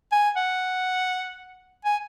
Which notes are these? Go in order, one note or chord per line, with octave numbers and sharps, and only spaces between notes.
G#5
F#5
G#5